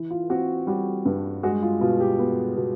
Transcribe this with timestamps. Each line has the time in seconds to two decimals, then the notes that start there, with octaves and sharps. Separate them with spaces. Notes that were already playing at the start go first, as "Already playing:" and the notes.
Already playing: E3
0.11 F4
0.29 C4 F#4
0.67 G3 F#4
1.05 G2
1.43 G#3 F#4
1.62 F4
1.81 B2 F4
2.00 G4
2.19 B3
2.57 B2